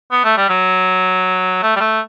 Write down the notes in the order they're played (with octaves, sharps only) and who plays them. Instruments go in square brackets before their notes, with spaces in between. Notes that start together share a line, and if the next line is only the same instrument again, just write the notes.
[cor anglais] B3
A3
G3
F#3
A3
G3
A3